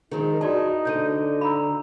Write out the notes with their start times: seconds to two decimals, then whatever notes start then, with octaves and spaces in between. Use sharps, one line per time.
0.11 D#3 F3 G#3 D#4 G#4 A#4
0.41 F#2 E4 F#4 D5 A5
0.85 D2 D3 G6 D#7
1.41 F5 A#5 B5 E6